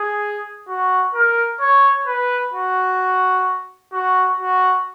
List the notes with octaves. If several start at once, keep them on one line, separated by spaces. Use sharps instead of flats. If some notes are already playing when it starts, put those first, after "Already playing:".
Already playing: G#4
F#4
A#4
C#5
B4
F#4
F#4
F#4